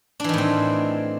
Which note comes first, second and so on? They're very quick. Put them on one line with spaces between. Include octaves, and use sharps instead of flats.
D4 E3 D#3 A2 C4